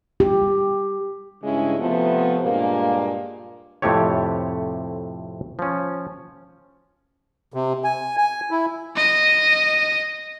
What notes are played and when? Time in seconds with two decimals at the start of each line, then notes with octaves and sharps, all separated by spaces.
0.20 G4
1.43 G2 C#3 G#3 C#4 E4
1.78 C3 F3 A3 B3
2.43 G2 A#2 G#3 A#3
3.82 F2 A2 C3 A3 G4 C#5
5.59 F3 C#4
7.54 C3
7.84 G#5
8.17 G#5
8.51 E4
8.97 D#5